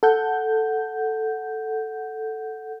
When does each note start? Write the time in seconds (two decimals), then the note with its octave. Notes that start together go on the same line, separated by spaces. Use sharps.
0.03 A4 F#5 G6